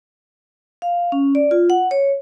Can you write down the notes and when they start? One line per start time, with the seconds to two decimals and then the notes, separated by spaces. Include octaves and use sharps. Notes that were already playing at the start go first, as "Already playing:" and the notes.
0.82 F5
1.12 C#4
1.35 D5
1.51 F4
1.70 F#5
1.91 C#5